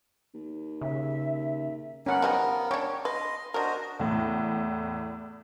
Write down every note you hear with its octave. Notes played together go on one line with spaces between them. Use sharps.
D#2
C#3 E5
B3 C#4 A#4 F#5
F3 G3 D#4
D4 G4 C#5
B4 D#5 C6
D4 F#4 A#4 C5 D#5
E2 A2